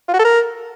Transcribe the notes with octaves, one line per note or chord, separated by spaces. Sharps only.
F4
F#4
A4
A#4